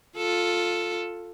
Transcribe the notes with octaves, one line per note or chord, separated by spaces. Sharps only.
F4 A4